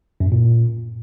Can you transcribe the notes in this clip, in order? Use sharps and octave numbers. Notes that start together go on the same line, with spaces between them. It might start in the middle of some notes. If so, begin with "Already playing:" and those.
F#2
G#2
A#2